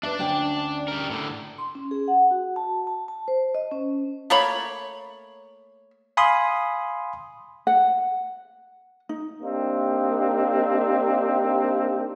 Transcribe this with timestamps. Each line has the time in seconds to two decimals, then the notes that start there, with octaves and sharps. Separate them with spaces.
0.03 D4 B4 D5 E5
0.19 D2 C#4 G5
0.88 G3 A#4
1.10 A2 D3
1.58 C6
1.75 C#4
1.91 G#4
2.08 F#5
2.31 F#4
2.56 A5
2.87 A5
3.08 A5
3.28 C5
3.55 D#5
3.71 C#4
4.30 A3 A#3 C#5 B5
6.17 F5 G#5 B5 C6 D#6
7.67 F#5
9.09 D#4
9.42 A#3 C4 D4 D#4 G4